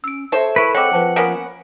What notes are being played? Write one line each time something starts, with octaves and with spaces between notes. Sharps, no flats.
C#4 E6 D7
A4 C5 C#5 E5 A5
E4 A#4 B4 A5 C#6
G#3 C4 C#5 F#5 D6
F3 B4 C5 A5
A#3 B3 C#4 B6 D7 E7